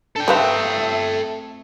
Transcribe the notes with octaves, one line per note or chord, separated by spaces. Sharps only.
D4 A4 G5
A3 C4 D#4 G4 B4 E5 F5